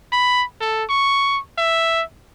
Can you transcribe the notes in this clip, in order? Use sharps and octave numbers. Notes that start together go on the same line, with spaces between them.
B5
A4
C#6
E5